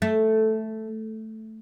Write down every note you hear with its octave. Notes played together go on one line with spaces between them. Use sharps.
A3